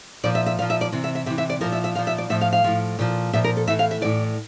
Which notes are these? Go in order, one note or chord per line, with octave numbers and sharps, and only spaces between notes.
A#2 F3 D5
E5
E5
A#2 F3 F5
E5
D5
C3 E3
E5
E5
C3 E3 E5
E5
D5
A#2 F3 A#4
E5
E5
A#2 F3 F5
E5
D5
A2 F3 E5
F5
F5
A2 F3
A#2 F3
A#2 F3 E5
A#4
A4
A2 E3 E5
F5
E5
A2 E3 D5